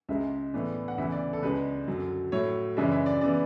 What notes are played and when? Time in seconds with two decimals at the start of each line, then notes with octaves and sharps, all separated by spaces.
0.09 C#2 C#3 G#3 E5
0.53 A2 E3 B3 D4
0.88 F#5
0.98 D2 C#3 E3 B3 E5
1.12 D5
1.33 A4
1.42 C#2 C#3 G#3 D4 B4
1.87 F#2 D3 F#3
2.32 A2 F#3 A3 C#5
2.77 F#2 C#3 E3 G#3 D4 E5
2.92 E5
3.06 D5
3.21 C#3 E3 B3 D5